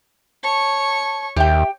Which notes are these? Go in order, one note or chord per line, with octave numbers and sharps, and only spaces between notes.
C#5 A5 C#6
D#2 G4 E5 G5